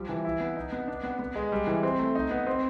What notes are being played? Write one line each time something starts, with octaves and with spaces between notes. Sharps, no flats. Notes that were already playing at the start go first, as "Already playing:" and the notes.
Already playing: F3 G3
E3
E4
B3
D#4
B3
D4
B3
B3
G#3
G3
E3
C4
A3
D#4
B3
C4